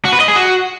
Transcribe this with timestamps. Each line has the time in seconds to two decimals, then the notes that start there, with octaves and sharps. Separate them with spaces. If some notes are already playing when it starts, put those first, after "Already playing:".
0.05 F#4
0.13 B4
0.20 D#5
0.28 G#4
0.36 F#4